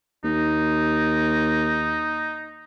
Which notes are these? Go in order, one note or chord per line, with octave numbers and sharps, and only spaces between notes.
D#2 D#4